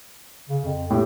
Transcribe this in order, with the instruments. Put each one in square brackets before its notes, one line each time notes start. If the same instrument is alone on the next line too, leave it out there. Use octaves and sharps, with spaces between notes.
[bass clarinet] C#3
F2
[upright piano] A2 [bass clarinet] G4